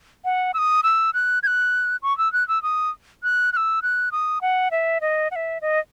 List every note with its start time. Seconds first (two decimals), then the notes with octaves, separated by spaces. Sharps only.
0.25 F#5
0.54 E6
0.58 D#6
0.83 E6
1.14 F#6
1.43 G#6
1.47 F#6
2.03 C#6
2.18 E6
2.33 F#6
2.48 E6
2.63 D#6
3.23 F#6
3.53 F#6
3.57 E6
3.83 F#6
4.12 D#6
4.42 F#5
4.71 E5
5.01 D#5
5.31 F#5
5.36 E5
5.62 D#5